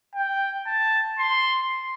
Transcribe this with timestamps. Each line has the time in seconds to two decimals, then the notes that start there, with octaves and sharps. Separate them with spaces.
0.15 G5
0.67 A5
1.19 C6